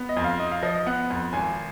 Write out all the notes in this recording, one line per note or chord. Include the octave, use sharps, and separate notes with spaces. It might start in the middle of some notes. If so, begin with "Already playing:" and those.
Already playing: B3
D#5
F2
F5
D#4 D#5
F5
F3 D#5
D#5
B3 F#5
F2
G#1 G#5